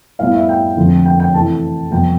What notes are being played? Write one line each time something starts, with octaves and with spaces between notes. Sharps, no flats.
A2 G3 B3 E4 F5
E5
G5
F2 D3 F3 A3 C4
G5
G5
E3 A3 C4 E4 A5
F2 C3 G3 B3 G5